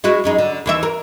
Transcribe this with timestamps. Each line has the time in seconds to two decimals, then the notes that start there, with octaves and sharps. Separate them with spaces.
0.04 G#3 E4 F#4
0.24 F#2 G#3 D#4
0.38 D3
0.66 D#2 E3 E5
0.83 A#4